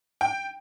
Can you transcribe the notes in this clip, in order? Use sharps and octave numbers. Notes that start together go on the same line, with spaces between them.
G5